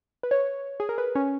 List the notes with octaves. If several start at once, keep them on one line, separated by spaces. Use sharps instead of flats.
B4
C#5
G#4
A#4
B4
C#4